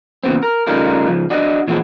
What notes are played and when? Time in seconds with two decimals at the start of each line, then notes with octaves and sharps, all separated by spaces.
0.24 E2 A#2 C#3 B3 C4
0.43 A#4
0.67 C#3 G3 A3 D#4 F4 A#4
1.07 C#2 F3
1.30 D4 F#4 D#5
1.67 A#2 E3 F3 G#3 B3